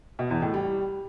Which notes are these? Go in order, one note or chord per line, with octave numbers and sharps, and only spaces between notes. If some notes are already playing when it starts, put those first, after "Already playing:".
B2
E2
A2
G3